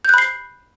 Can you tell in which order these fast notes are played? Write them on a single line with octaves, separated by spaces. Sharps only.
G6 F#6 B5 C7